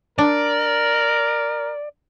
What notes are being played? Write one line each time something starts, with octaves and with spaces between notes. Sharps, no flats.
D4 A#4 D5